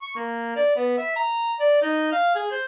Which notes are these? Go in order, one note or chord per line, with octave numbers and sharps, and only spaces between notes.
C#6
A#3
D5
B3
E5
A#5
D5
D#4
F5
G#4
C5